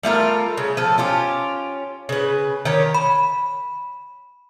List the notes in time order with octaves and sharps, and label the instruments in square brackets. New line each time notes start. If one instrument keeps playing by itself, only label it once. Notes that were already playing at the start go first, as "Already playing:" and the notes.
[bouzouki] G3 A3 F4 A#4
C#3
F3 A4
C#4 F4 G4
C#3 B4
D#3 G4 C#5
[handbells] B5